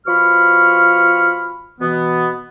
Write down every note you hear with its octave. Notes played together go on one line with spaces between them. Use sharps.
B2 F3 B5 C#6 F6
B2 E3 B3